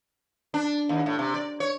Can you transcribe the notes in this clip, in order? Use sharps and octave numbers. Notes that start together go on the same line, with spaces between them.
D4
D#2
A2
C3
D5
C#5